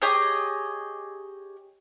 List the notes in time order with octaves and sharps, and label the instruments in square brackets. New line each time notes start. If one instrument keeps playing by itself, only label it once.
[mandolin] G4 G#4 C#5 D#5